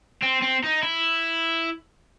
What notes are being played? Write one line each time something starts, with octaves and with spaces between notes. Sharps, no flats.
C4
C4
D#4
E4